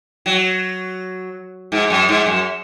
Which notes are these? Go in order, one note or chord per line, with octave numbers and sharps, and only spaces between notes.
F#3
G#2
F#2
G#2
F#2